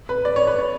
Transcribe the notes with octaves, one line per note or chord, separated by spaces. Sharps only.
B4
D5
C#5
B4
C#5